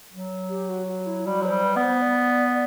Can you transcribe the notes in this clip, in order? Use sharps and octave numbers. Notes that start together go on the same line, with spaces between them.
F#3
G4
F#4
F#4
E4
G3 F#4
F#3 C5
G3
B4
B3
C5
D5